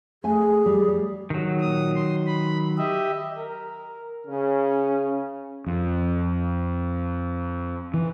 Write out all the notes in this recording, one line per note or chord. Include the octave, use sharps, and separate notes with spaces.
A3 G#4 G#5
G3
G3
D#3 F#3
A#2 D#6
C6
B5
G4 D#5 E5
A#4
C#3 C#4
F2
E3